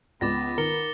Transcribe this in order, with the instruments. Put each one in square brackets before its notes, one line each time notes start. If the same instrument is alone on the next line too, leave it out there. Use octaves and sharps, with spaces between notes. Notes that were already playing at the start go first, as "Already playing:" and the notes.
[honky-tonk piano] C#2 [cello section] B3 [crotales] D6 A6 A#6
[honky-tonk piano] D#3 [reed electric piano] A#4 [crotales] A#6 C#7 G7